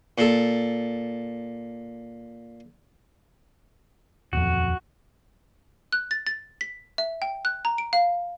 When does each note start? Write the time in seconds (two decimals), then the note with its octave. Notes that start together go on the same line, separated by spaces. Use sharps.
0.18 A#2 A4
4.33 D#1 F2 F#4
5.92 F#6
6.11 A6
6.27 A6
6.61 B6
6.98 E5
7.22 G5
7.45 F#6
7.65 A#5
7.78 D7
7.93 F5